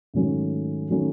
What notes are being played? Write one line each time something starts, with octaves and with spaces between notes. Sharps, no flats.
G#2 D#3 F#3 A3 C#4
D#3 F#3 A3 C#4